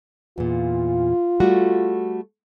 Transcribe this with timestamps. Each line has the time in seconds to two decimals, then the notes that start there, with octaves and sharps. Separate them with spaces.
0.38 E2 A#2 F4
1.40 G3 A3 F#4